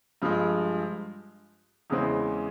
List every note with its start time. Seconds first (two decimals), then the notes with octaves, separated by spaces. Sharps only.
0.22 G2 F3 G#3
1.90 E2 C#3 E3 G#3 C4